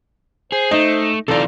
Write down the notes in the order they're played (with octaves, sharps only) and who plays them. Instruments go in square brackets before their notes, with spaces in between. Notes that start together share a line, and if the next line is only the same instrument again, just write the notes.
[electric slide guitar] G#4 [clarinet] C5
[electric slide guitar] A3 [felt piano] D#4
[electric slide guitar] C3 E3 F4 [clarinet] D#4 [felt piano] A4 D5